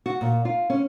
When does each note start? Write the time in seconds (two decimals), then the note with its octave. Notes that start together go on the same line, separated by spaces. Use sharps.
0.06 F#4
0.21 A#2
0.45 F4
0.70 C#4